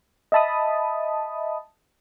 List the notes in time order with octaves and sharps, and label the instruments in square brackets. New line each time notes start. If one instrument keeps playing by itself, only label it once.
[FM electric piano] D#5 E5 A5 B5 D#6